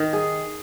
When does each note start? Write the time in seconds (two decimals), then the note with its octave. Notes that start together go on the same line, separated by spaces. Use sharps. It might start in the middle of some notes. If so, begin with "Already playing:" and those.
Already playing: D#3 D#4
0.13 G#4